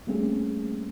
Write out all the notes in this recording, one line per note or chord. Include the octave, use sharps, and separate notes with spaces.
G3 A3 A#3 C4 C#4 G#4